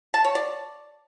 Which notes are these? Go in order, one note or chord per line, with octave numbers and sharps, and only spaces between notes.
A5
C#5
D5